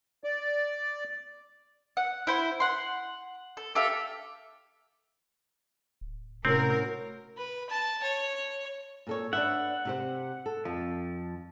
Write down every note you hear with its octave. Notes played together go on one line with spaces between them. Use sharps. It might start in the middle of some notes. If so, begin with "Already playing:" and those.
D5
F#5
E4 C5
F#5 C6
A4
G4 A4 E5 F5
D1
A2 C3 C4 C#4 F#4 A#4
B4
A5
C#5
A#2 A4 C#5
D4 B4 E5 F#5
C3 G4 C5
A4
F2 F3